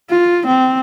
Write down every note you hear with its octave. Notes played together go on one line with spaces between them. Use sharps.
F4
C4